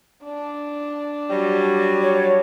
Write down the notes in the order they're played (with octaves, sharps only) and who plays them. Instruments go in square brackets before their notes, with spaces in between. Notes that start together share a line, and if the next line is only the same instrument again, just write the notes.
[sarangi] D4
[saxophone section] F#3 G3
[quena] C#5